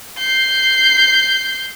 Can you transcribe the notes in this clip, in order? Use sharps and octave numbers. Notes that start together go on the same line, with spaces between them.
G6 C7